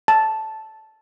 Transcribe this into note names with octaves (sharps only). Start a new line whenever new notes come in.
A5